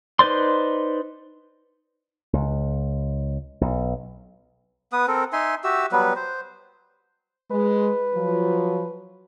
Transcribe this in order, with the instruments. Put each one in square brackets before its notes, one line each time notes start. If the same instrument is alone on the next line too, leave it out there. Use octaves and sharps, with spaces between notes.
[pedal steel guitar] D#4 B4 C5 D5 C6
[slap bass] C#2
B1
[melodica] B3 B4 D#6
C4 A4 A#4
D#4 E5 G#5 C6
F#4 G4 E5 E6
F#3 G3 B3 B4
C5
[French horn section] G#3 [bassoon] B4
[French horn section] F3 F#3